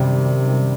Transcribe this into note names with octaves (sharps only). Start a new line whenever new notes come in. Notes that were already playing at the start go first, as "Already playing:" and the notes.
Already playing: F#2 C3 D#3 G3